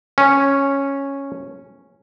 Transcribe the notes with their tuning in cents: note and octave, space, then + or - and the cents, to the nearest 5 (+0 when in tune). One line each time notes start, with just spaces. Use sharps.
C#4 -5